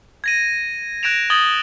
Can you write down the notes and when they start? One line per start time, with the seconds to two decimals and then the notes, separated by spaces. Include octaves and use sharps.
0.24 G#6 A#6 D#7
1.03 F#6 G#6 A#6 D7 E7 F7
1.30 D#6 G#6 A6 F#7 G7